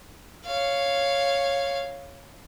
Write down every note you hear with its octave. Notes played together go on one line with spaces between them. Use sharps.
C#5 F5